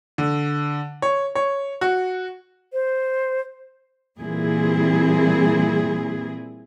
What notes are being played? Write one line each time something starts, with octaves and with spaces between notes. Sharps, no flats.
D3
C#5
C#5
F#4
C5
A#2 E3 G3 C4 E4 G#4